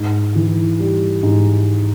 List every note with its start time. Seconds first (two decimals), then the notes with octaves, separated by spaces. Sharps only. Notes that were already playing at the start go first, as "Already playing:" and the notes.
Already playing: G#2
0.35 E3
0.79 G3
1.23 G#2